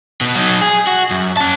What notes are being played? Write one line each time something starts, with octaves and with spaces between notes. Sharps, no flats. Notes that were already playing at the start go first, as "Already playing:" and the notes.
B2 B3
F#3 D#4
G#4
F#4
F#2
C#4 A5